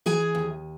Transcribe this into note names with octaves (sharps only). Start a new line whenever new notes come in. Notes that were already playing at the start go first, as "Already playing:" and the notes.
E3 G#4 G#5
D#2